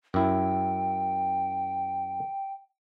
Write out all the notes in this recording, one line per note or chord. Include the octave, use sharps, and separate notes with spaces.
F#2 E4 G5